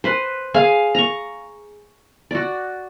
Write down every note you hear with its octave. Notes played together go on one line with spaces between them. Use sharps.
B4 C5
G#4 F5
A#5 C#6
F#4 D5